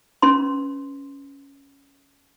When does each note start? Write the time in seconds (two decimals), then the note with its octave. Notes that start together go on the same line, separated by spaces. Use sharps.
0.22 C#4 B4 C6